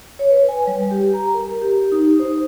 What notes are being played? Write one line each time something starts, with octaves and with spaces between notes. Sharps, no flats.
C#5
B4
G#5
G3
G4
A#5
A#4
G4
D#4
C5